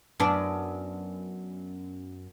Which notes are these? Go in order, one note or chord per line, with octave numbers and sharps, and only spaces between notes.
F#2 B3 D4